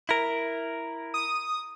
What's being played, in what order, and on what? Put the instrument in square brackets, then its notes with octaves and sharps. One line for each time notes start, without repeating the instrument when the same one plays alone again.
[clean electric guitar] E4 A#4
[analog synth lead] D#6